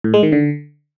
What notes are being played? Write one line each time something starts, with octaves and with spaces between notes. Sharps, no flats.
A2
G#3
D#3
D3